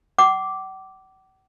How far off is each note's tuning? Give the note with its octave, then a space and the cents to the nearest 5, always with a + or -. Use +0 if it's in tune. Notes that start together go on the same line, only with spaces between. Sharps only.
F#5 +45 D6 -5